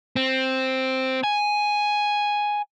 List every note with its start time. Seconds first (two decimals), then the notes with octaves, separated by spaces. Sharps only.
0.16 C4
1.24 G#5